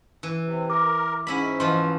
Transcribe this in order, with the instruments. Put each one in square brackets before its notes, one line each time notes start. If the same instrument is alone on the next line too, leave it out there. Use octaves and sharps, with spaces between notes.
[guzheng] E3
[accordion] C3
[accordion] A#4 [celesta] D6
[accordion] G#2 [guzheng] C#4 E4 B5
[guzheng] E3 F3 [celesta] C6